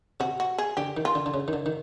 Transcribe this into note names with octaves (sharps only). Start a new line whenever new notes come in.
C3 F#4
F#4
G#4
D3 G4
D#3
F4
D3
D3
C#3
D#3
D3
D#3